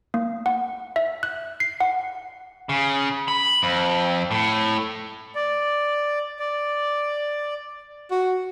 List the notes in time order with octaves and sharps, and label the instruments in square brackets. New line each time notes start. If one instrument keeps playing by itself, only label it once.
[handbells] A#3
F#5
E5
F#6
C7
F#5
[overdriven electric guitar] C#3
B5
F2
A2
[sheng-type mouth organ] D5
D5
[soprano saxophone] F#4